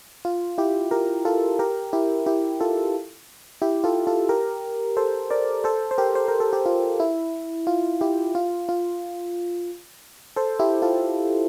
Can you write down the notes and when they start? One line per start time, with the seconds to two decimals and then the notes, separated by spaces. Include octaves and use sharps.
0.25 F4
0.58 E4 G4
0.91 G4 A#4
1.25 F4 A4
1.59 G4 A#4
1.93 E4 G4
2.26 E4 G4
2.60 F4 A4
3.62 E4 G4
3.84 F4 A4
4.07 F4 A4
4.29 G4 A#4
4.97 A4 C5
5.31 A#4 D5
5.64 A4 C5
5.91 C5
5.98 G4 A#4
6.15 C5
6.28 A#4
6.40 A4
6.53 G4
6.66 F4
7.00 E4
7.67 F4
8.01 E4 G4
8.35 F4
8.69 F4
10.36 A4 C5
10.60 E4 G4
10.82 F4 A4